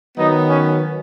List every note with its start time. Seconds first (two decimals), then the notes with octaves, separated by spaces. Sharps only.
0.17 D#3 F#3 B3 D#4
0.49 C#4